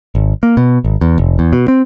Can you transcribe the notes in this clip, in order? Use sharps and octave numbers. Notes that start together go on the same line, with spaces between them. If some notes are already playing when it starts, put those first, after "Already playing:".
G#1
A#3
B2
G#1
E2
F1
E2
B2
C4